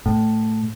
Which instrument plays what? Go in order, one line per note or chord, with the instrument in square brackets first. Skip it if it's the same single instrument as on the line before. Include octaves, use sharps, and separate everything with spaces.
[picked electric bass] A2